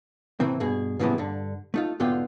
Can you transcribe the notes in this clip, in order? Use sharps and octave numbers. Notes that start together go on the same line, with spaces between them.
A2 C3 E3 C4
G2 B2 G#4
A2 C#3 E3 F3 G3 B3
G2 D3
A3 D#4 F4
B1 G#2 D3 B3 F4 G5